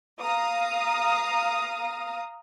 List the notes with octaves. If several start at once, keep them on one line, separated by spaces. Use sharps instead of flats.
F5 A#5 D#6